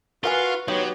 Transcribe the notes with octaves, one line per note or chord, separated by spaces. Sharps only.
F4 F#4 A#4 B4 F5 F#5 G#5 C#6
F#3 B3 D#4 G4 C5 C#5